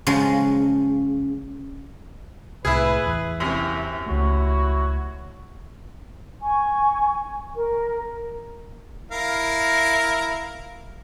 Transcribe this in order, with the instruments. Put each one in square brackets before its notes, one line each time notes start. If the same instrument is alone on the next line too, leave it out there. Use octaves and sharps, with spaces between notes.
[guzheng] C#3 F3 F#3 G#3
[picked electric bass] C2 A2 [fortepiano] E4 G#4 [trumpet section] B4
[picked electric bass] E2
[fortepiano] F#2 C3 [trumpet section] A#3 E4
[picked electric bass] C#2 A3 [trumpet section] E4 F#4 C#5
[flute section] G#5 C#6
A#4
[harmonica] E4 A#4 F5